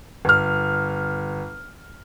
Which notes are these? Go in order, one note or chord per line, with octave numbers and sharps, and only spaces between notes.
G1 F6